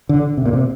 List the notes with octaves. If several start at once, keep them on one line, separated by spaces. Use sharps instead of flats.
D3
C3
A#2
C3